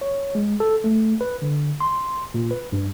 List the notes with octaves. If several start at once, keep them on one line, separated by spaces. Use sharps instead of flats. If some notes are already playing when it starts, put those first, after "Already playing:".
C#5
G#3
A4
A3
B4
D3
C6
A#2
B4
G2